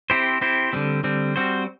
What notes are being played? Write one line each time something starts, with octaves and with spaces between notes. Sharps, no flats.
C4 E4 G4 C5
C4 E4 G4 C5
D3 G3 C4
D3 G3 C4
G3 C4 F#4 C5